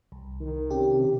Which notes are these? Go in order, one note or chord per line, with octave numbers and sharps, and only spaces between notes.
C2
D#3
C3 C#4 G4